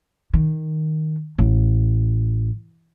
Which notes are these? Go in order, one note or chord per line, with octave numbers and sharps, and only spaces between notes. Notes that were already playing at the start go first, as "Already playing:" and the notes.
D#3
A1